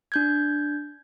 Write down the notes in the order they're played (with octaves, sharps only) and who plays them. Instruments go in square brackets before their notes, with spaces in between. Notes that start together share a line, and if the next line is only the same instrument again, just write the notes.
[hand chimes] D4 G6 G#6